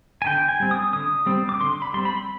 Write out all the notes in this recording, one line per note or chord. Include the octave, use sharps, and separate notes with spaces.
G#5
D3 G5
G#5
G3 C4
D#6
D3 D#6
G3 C4
D6
D3 C6
B5
G3 C4 C6
B5